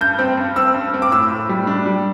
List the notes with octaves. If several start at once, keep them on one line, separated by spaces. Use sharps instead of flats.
G2 G6
C4
G2
C4 E6
G2
C4
D6
A2 E6
A2
G3
D4
G3